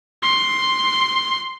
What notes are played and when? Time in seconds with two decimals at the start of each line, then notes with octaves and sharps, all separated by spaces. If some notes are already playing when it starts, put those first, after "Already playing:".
0.23 C6